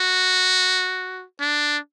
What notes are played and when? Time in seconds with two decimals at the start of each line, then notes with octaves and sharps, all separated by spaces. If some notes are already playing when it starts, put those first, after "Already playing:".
Already playing: F#4
1.40 D4